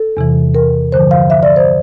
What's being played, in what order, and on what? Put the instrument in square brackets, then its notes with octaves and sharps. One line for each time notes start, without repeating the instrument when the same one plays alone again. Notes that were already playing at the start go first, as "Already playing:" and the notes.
Already playing: [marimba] A4
E2 C3 E3
A#4
G2 D3 F3 C5
F5
E5
D5
C5